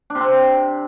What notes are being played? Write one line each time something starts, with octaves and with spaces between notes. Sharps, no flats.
D4
C3
C4